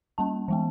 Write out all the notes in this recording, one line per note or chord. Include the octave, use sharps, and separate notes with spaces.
G3 A#3 C#4 A5
E3 G#3 B3